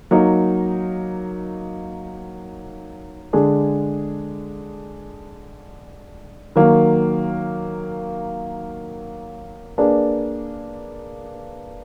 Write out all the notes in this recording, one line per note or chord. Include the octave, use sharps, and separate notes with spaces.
F#3 A#3 D#4
D3 G#3 D4 G#4
D#3 F#3 A#3
A#3 D4 G#4 B4 D5